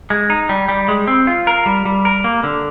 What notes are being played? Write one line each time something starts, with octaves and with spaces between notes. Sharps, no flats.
G#3
D#4
G3
G3
G#3
C4
F4
A#4
G3
G3
A#4
A#3
D3